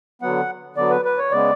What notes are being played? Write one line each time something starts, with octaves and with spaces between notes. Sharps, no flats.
D3 F#3 B3 F#5
D3 F#3 B3 D5
B4
B4
C#5
C#3 G#3 B3 D5